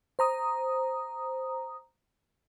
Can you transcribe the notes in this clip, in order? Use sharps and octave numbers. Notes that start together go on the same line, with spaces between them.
C5 A#5 D#6